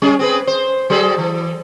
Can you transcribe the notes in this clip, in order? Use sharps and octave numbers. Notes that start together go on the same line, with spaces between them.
G3 C#4 G#4
C4 G#4 B4
C5
F#3 G#4 A4
E3